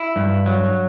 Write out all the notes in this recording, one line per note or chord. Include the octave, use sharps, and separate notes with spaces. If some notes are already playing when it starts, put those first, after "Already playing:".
Already playing: E4
G2
F#3